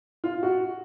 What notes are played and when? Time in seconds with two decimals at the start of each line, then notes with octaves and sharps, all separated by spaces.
0.24 F4
0.43 F#4